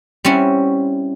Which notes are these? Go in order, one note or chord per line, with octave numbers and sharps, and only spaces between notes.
G3 C4 C#4 E4 F#4